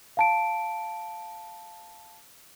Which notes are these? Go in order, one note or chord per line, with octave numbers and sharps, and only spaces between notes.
F5 A5 D7